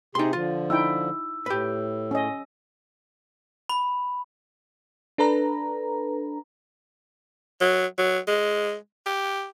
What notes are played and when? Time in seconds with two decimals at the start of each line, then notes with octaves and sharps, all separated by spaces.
0.15 C3 D#4 G4 G#4 C6
0.33 D3 F3 F4
0.70 D#4 E4 G5 E6
1.46 A2 G4 B4
2.11 C#4 D#5
3.69 B5
5.18 D4 A4 B4 A#5
7.61 F#3
7.98 F#3
8.28 G#3
9.06 G4